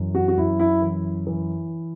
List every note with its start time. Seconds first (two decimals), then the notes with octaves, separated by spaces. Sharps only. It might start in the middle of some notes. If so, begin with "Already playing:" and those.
Already playing: F#2 E3
0.15 F#4
0.28 F#4
0.37 F#2 E4
0.59 E4
0.82 E3
1.27 E3